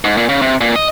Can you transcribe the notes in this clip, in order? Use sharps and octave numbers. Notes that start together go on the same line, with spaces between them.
G#2
A#2
C#3
C3
A#2
D#5